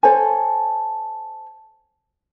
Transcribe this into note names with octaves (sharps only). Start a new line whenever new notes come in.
A4 C5 C#5 G#5